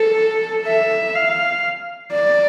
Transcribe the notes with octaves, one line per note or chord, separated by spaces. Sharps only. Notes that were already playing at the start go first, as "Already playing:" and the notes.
Already playing: A4
E5
F5
D5